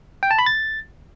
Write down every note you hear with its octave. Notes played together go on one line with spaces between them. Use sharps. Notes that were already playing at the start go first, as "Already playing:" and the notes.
G5
A5
B5
A6